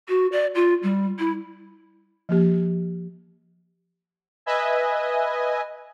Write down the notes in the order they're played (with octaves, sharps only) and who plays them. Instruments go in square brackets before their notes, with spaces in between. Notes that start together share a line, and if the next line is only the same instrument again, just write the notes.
[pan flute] F#4
D5
F4
G3
E4
[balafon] F3 A#3 G4
[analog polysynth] B4 D#5 E5 G#5